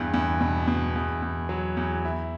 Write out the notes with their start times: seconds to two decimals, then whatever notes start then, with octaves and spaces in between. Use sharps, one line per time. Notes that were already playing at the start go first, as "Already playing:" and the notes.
Already playing: E2 G2
0.14 E2
0.41 B2
0.68 B2
0.96 E2
1.22 E2
1.49 F#3
1.77 E2
2.05 E4